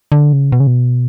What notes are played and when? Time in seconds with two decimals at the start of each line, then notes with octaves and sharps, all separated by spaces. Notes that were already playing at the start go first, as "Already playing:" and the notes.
0.12 D3
0.33 C#3
0.52 B2
0.60 C#3
0.67 B2